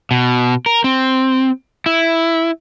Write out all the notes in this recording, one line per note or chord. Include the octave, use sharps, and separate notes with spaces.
B2
A#4
C4
E4